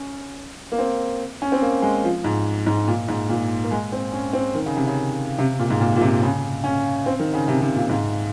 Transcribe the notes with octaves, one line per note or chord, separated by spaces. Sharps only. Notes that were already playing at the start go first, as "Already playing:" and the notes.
Already playing: C#4
A#3
C4
C#4
C4
A#3
G#3
F3
G#2
G#2
A#2
G#2
A#2
A#3
G#3
C4
C#4
C4
D#3
C#3
C3
C#3
C3
A#2
G#2
A#2
A#2
C3
C#3
C#4
C4
D#3
C#3
C3
C3
A#2
G#2